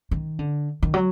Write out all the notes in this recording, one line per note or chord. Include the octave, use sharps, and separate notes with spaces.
D#3
D3
D#3
F#3